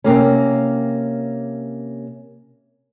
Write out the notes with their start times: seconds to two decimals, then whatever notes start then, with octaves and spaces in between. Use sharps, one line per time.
0.04 C3 A#3 C#4